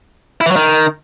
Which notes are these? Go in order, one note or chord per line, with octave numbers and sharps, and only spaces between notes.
E4
E3
F#3
D#3